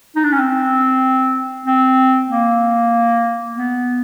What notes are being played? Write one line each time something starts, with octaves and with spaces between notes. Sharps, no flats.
D#4
D4
C#4
C4
C4
A#3
B3